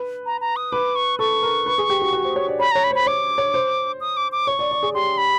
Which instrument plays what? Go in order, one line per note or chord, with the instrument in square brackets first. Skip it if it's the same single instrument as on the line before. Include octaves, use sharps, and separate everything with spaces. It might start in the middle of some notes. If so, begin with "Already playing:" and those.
Already playing: [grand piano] B4
[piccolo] A#5
A#5
D#6
[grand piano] B4 [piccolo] D6
[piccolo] C#6
[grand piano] A4 [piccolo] C#6
[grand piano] A#4
B4
G#4
G4
F#4
F#4
C5
C#5
D5
[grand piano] C#5 [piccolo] B5
[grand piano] C#5 [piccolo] A#5
[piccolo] B5
[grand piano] C5
[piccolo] B5
[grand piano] C#5 [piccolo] D6
[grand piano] C#5
C5
[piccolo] D#6
D6
D6
[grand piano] C#5 [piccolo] C#6
[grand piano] D5
D5
G#4
[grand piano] G4 [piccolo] C6
[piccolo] B5